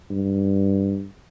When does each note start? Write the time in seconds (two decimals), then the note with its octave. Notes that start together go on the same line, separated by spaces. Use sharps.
0.11 G2